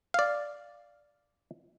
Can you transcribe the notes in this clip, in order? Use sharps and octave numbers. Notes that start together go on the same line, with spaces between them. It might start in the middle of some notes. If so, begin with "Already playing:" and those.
D5 F5